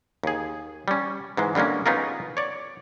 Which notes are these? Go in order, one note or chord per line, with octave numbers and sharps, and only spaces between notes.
D#2 G#4
G3 C#4
G#2 E3 G#3
D3 G3 G#3 A#3 C#4
B3 C#4 D#4 F4 G#4 A#4
C#5 D5